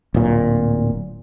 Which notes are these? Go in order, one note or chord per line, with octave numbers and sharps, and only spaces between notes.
D1 A#2